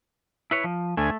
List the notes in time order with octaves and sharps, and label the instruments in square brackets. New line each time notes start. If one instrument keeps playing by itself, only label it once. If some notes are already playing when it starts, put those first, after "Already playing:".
[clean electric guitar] E4 B4 C#5
F3
[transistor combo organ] D2 G#5 [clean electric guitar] A3